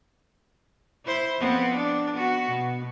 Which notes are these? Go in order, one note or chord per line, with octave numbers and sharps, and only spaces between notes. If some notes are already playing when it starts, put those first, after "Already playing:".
E4 C5
F2 B3 C4
D4
B3 F#4
B2